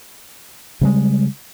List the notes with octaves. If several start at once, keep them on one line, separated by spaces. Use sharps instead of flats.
C#3 G3 G#3